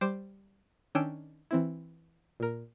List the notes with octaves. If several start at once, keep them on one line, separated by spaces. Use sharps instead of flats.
G3 C5 D6
D#3 C#4 D4 G5 E6
E3 C4 E4
A#2 A#4